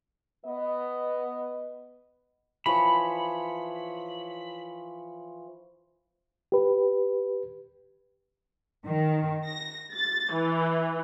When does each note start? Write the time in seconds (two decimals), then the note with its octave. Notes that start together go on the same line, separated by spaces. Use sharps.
0.46 B3 D#5
2.66 E3 F3 C#5 B5
6.52 G4 B4
8.86 D#3
9.45 A#6
9.93 A6
10.33 E3